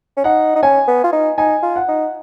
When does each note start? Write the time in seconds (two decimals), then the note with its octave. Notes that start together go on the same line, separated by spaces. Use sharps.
0.17 C#4
0.24 D#4 F#5
0.55 D#4
0.63 C#4 G#5
0.88 B3
1.04 F4
1.12 D#4
1.38 D#4 G#5
1.63 F4
1.76 F#5
1.88 D#4